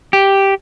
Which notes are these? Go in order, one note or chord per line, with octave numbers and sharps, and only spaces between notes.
G4